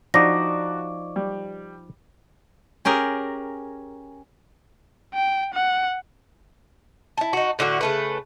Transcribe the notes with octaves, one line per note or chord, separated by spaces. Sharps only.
F3 D4 D#4 F#4 D5 C#6 D6 A#6
G3
C#4 G4 G#4 A#4
G5
F#5
E4 A5
D#4 F#4
A2 D3 A3 F#4
C#3 A3 B4